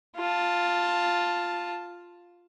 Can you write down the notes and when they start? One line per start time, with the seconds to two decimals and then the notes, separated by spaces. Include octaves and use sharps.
0.16 F4 A5